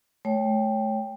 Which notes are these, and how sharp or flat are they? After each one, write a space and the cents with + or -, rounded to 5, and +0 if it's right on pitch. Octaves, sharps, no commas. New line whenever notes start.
A3 -30 C#5 +0 G5 +5